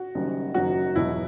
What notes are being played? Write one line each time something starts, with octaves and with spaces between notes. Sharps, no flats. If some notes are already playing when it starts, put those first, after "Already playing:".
Already playing: F#4
F#1 F#2 D#3 G3
F#1 F#2 D#3 F#3 F#4
E1 E2 B2 F#3 E4